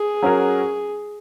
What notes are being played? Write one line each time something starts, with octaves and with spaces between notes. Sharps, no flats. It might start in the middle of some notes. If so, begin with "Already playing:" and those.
Already playing: G#4
F#3 C#4 F#4 A#4